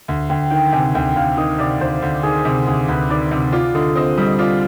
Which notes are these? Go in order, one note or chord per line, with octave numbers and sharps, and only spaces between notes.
D2
D2 G5
D#3 G5
C3 G#5
D2 G5
D2 F5
D#3 D#5
C3 D5
D2 C5
D2
D#3 G#4
C3
D2 G#4
D2 B4
D#3 D5
C3
F4 D5
D3 D#5
C4 D#5
G3 D#5
F4 D5